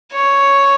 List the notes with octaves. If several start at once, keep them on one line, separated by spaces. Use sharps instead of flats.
C#5